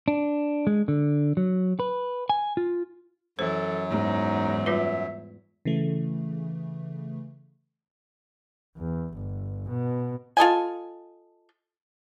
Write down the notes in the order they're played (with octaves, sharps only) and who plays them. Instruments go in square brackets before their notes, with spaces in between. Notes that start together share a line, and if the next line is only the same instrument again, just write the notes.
[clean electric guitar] D4
G#3
D3
F#3
B4
G#5
F4
[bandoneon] F#2 F#3 [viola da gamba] E3 [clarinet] A4 [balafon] C5
[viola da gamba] E2 G#2 [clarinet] D#4
[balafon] G3 F4 B4 [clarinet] E5
[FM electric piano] C#3 E3 A3
[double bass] E2
G1
B2
[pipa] F4 A4 D#5 G#5